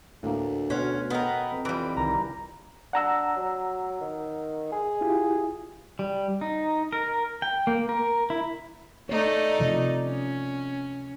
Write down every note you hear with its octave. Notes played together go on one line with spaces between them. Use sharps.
D2 A2 A#3
B2 C#4 C6 F6 F#6
B3 A4 A#4 D#5 G5
F2
E3 G3 F4 D5
C2 D#3 A#5
D4 F#5 A#5 E6
F#3
D#3
G#4
E4 F4 G4
G3
D#4
A#4
G5
A#3
A#4
E4
A3 D#4 C#5 D5
C3 F3 D#5
C#4